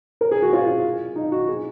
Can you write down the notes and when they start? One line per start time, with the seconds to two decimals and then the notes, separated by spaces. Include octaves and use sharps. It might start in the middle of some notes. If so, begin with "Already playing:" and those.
0.21 A#4
0.31 G#4
0.42 F#4
0.53 F4
1.16 D#4
1.32 F#4
1.49 G#4